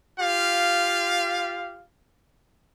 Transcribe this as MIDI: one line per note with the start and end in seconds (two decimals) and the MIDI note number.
0.20 1.84 65
0.20 1.84 67
0.20 1.84 77